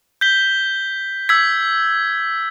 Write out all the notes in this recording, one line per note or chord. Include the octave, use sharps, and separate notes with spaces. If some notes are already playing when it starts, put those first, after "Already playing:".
G6 B6 G7
E6 G#6 B6